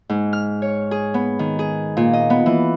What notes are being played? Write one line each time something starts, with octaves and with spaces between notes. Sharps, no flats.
G#2
F6
C#5
G#4
B3
D#3
G#4
A#2
D#5
B3
E3